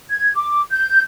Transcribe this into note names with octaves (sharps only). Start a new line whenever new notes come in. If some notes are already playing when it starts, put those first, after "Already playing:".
G#6
D6
G6